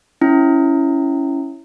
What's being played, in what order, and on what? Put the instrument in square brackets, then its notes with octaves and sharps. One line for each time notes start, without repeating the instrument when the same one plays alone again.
[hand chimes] C#4 E4